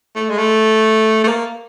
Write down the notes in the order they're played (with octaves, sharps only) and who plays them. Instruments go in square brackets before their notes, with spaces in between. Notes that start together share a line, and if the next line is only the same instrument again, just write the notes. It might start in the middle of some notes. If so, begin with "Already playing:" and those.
[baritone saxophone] A3
G#3
A3
A3
A#3